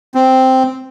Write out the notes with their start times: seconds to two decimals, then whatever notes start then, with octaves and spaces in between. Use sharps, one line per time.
0.15 C4